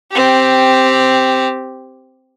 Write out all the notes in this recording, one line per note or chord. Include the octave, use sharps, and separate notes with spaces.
C4 G4